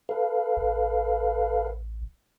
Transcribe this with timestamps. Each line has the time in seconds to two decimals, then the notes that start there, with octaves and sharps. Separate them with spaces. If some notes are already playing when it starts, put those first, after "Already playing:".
0.09 A4 B4 F5
0.57 A1